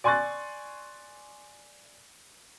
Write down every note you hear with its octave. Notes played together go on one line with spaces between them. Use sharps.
D5 G#5 C6 C#6 F#6 A6